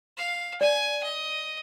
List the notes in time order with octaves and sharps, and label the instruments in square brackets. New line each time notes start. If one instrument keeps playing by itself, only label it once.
[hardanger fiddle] F5
[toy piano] D5 [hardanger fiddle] G#5
[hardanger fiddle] D#5